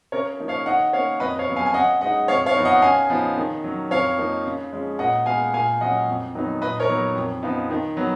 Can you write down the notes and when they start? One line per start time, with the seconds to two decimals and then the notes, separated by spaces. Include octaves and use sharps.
0.12 C#3 A#4 C#5
0.39 F3 A#3 D#4
0.48 C#5 F5
0.66 D#3 D#5 F#5
0.93 C#4 C#5 F5
0.97 A#3
1.20 F2 B4 D#5
1.39 C#5 F5
1.48 C#3 F#3 B3
1.56 F5 G#5
1.66 G#5
1.74 C#3 D#5 F#5
2.01 G#3 D#5 F#5
2.06 D#4
2.28 F2 C#5 F5
2.46 C#5 F5
2.56 F3 B3 D#4
2.65 D#5 F#5
2.82 C#3 F5 G#5
3.10 F3 B3 D#4
3.38 D#3
3.64 F#3 C#4
3.91 F2 C#5 F5
4.18 F3 A#3 D#4
4.46 C#3
4.73 F3 G#3 C#4
4.99 A#2 D#5 F#5
5.26 G#3 B3 F5 G#5
5.53 A#2 F5 G#5
5.81 F#3 C#4 D#5 F#5
6.08 F2
6.35 D#3 F#3 B3 D#4
6.62 A#2 B4 D#5
6.80 A#4 C#5
6.89 F#3 B3 D#4
7.15 F2
7.43 C#3 F3 B3 D#4
7.71 D#3
7.97 F#3 B3